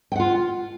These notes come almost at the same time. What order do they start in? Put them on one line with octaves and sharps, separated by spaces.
G5 F#5 F4